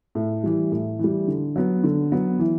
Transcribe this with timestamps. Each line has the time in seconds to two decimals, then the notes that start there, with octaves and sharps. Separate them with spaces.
0.15 A2
0.44 E3 G3
0.72 A2
0.99 E3 G3
1.28 D3
1.56 F#3 B3
1.84 D3
2.12 F#3 B3
2.39 E3